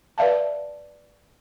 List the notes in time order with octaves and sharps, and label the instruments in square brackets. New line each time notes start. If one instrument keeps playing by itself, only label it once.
[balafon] B4 D5 E5 F5 A5